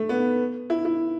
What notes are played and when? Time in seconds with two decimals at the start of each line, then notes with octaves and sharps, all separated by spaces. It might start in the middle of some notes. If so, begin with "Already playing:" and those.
Already playing: A3
0.09 B3
0.70 E4
0.85 E4